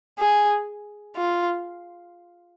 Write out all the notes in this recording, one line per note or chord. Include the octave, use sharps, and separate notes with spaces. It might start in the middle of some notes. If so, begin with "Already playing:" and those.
G#4
F4